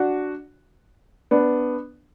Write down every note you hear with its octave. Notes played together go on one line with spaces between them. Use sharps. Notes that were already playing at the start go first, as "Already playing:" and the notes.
Already playing: D4 F#4
B3 D4